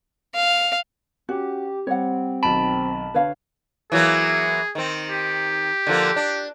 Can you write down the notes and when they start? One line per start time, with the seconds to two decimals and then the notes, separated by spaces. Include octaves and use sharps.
0.35 F5
1.29 C#4 F#4 G4
1.87 G3 C4 C#5 F#5
2.43 B1 D#3 A5 B5 D7
3.14 D3 B4 C#5 F5
3.92 E3 F#3 A#3 G#4
4.75 D#3 C4
5.09 G4
5.87 D3 F3 A#3
6.16 D4